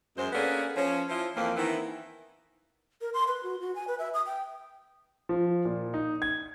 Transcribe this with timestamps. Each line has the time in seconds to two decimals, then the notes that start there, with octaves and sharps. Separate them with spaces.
0.17 F#2 G#3 C5
0.33 A#3 B3 C#4 D4 G#4 A4
0.77 F3 C#4
1.10 F3 E4 C5
1.35 F2 E3 F3 A#3
1.56 D#3 E3 B3 C4 E4
3.01 A#4
3.14 C6
3.28 B4
3.43 F#4
3.61 F#4
3.75 G#5
3.88 B4
3.99 E5
4.14 D#6
4.26 G5
5.29 F3
5.65 A#2
5.94 D#4
6.22 G#6